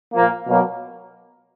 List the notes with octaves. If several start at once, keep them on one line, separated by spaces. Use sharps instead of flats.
A#2 F3 A#3
B2 F#3 A#3